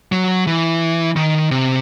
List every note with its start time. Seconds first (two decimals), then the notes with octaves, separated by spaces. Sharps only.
0.12 F#3
0.47 E3
1.16 D#3
1.51 C3